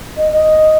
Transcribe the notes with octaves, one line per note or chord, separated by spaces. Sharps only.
D#5
D#5